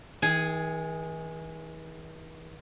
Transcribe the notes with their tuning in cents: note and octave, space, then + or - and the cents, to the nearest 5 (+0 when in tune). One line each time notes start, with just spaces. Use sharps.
E3 -45 G#4 +0 G#5 +0